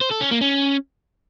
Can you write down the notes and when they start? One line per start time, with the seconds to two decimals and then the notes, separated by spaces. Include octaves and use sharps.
0.01 C5
0.11 A4
0.21 C#4
0.31 A#3
0.41 C#4